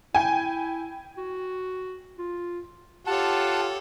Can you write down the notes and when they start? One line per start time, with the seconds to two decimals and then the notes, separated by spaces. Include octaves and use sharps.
0.15 E4 G5 G#5
1.18 F#4
2.18 F4
3.07 F4 G4 A4 C#5 F#5 A5